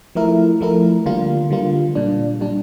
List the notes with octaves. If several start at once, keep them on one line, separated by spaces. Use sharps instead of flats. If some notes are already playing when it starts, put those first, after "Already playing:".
F3 A3 E4 A#4
F3 A3 E4 A#4
D3 G3 A#3 F4
D3 G3 A#3 F4
A#2 G3 D4
A#2 G3 D4